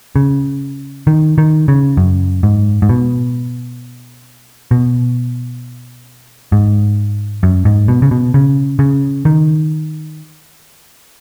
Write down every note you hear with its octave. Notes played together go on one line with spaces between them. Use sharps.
C#3
D#3
D#3
C#3
F#2
G#2
G#2
B2
B2
G#2
F#2
G#2
B2
C#3
B2
C#3
C#3
D#3